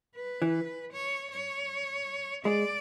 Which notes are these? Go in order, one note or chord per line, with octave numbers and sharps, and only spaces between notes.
B4
E3
C#5
C#5
G#3 D5